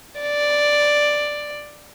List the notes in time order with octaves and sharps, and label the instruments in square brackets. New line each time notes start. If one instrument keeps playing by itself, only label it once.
[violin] D5